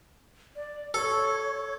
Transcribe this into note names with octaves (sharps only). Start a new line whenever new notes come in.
D5
A4 C#5